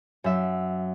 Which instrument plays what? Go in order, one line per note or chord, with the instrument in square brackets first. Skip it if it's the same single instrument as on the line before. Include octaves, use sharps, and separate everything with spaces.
[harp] F#2 E5